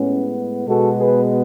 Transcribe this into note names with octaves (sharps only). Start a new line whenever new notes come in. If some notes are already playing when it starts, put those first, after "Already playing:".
Already playing: A2 G#3 B3 C#4
B2 G#3 B3 F#4 A4
G#4 B4